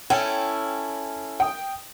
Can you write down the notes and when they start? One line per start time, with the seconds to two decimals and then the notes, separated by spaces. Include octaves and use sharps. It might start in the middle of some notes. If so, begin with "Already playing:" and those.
0.10 C#4 E4 A4 G5 G#5
1.40 G5 D#6